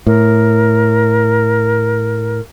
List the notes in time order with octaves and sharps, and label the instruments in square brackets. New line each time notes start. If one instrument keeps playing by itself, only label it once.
[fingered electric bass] A2 [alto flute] A#4